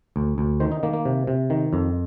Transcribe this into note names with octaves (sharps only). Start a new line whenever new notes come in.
D2
D2
D#3 C5
D#4
D#3 A#3
A#3
C3
C3
D#3
F2